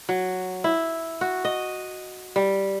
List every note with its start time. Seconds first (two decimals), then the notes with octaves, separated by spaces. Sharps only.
0.09 F#3
0.64 E4
1.21 F#4
1.45 D#5
2.36 G3